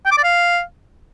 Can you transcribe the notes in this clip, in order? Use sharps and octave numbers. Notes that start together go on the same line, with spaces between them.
G5
D6
D5
F5